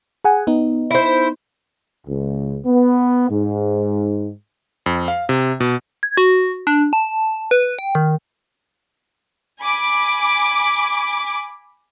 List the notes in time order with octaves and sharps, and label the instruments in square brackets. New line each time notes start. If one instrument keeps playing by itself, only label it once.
[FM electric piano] G#4 F#5 G#5
B3 D#4
[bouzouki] E4 C5
[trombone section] C#2
B3
G#2
[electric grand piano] F2
F5
C3
B2
[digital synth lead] G#6
F#4
D4
A5
B4
G5
D#3
[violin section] G#5 B5 D6